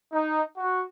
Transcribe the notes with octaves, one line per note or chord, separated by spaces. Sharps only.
D#4
F#4